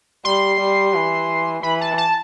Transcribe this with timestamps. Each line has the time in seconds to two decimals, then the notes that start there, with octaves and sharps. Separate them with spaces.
0.25 G3 C6
0.60 G3
0.95 E3
1.63 E3 B5
1.81 A5
1.98 A5